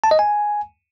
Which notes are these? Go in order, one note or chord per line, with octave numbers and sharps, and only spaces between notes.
A5
D#5
G#5